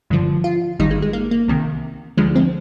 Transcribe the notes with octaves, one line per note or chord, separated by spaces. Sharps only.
G1 G2 D3 F3
F4
G#1 G2 D#3 G3 D#4
G#3
G#3
A#3
A#3
C2 C3 D#3
D2 D3 F3 G#3
C4